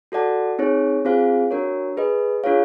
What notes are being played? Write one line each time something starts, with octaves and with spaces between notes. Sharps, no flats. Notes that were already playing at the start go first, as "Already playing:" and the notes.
F#4 A4 D5 F#5 A5
C4 D#4 G#4 C#5
C4 F4 G#4 C5 F5
D4 F#4 A#4 C#5
G#4 B4 D#5
D4 F4 G#4 C#5 F5